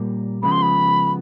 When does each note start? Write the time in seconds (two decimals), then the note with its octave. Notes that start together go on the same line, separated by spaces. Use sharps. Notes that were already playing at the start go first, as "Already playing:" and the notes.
Already playing: A#2 G3 A#3
0.43 C#3 F3 G#3 B3 B5
0.52 C6
0.62 B5